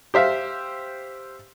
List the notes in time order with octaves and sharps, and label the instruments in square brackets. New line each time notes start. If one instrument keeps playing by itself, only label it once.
[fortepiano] G4 C5 E5 F5